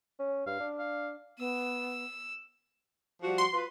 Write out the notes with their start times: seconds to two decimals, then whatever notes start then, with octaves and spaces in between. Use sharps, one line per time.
0.19 C#4
0.47 G2 F5
0.60 D4
0.79 F5
1.39 B3 E6
3.22 F3 G3 F#4
3.38 C6
3.54 F4 B4